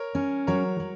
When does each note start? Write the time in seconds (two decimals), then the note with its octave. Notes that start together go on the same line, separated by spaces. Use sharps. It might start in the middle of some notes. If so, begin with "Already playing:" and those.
Already playing: A#4 C#5
0.15 C#4
0.47 F#3 A#4 C#5
0.80 F#3